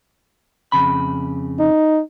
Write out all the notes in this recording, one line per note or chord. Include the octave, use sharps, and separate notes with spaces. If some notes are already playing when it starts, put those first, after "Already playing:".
F2 C#3 B5
D#4